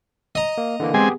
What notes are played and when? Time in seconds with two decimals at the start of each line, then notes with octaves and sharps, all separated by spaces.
0.35 D#5 A#5
0.58 A#3
0.80 D3 E3 A#3
0.94 G#3 B3 C4 G4 G#4 G#5